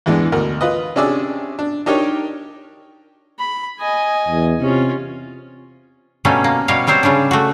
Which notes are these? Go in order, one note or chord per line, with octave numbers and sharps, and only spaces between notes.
E2 E3 G#3 D4
D2 B2 A#4
F4 B4 D#5
C3 C#4 D4 G#4 D5 E6
D4
D4 D#4 G4 A#4 C#5
B5
D#5 G#5
E2
C3 C#4 F4
B2 G3 A3 A#3 C#4 D4
A#3
B2 G3 C#5 F5
F#3 G3 C4 C5 C#5
C#3 G3 C#4 D4
A3 F#4